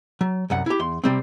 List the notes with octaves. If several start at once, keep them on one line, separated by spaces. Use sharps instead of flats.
F#3
C2 F#2 F#5
E4 G4
E2 C6
C3 G3 C4